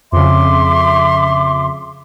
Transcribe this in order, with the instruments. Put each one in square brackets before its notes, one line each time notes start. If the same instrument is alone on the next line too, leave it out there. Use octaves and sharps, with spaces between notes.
[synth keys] F2 C#3 [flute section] E5 C6 D6